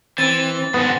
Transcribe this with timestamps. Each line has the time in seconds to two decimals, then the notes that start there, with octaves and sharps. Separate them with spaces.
0.18 E3 C4 A6
0.74 G#2 D3 B3 F#5